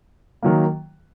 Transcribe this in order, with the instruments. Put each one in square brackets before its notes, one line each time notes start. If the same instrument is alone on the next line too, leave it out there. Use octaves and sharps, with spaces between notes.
[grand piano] D#3 F#3 A#3